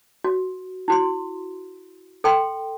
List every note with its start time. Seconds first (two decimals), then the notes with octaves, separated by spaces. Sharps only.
0.24 F#4
0.88 E4 F#4 C6
2.24 A4 G5 C6